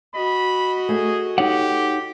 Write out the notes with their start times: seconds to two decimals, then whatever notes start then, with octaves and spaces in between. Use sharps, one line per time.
0.15 F#4 D#5 B5
0.89 A3 G#4
1.38 D#4 G4 C#5 F#5